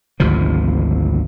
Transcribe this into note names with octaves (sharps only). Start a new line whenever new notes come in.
G#1 D2 C3 F3